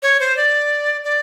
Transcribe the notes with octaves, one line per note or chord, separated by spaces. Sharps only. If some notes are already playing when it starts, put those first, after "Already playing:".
C#5
C5
D5
D5